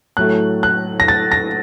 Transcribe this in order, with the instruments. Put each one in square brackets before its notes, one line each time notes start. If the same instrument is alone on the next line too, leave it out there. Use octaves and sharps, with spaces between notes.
[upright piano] A2 F#3 A3 F#6
F#6
A#6
A6
A#6